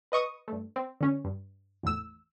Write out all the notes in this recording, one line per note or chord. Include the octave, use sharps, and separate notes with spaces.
B4 D#5 C#6 D#6
G2 A3
C4
D3 C#4
G2
G#1 E2 A2 E6